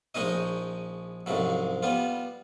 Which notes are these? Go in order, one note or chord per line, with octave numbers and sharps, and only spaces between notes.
A#1 G#3 C#4 D#4 D#5
C2 F2 G#2 C#3 F#3
G3 B3 F4